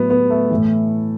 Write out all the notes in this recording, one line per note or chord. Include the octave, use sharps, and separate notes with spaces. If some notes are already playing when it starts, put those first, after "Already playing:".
Already playing: A2 F#3 B3
B3
A3
A2 E3